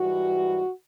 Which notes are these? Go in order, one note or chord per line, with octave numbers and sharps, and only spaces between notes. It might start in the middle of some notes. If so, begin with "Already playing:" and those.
Already playing: G#2 E3 G3 F#4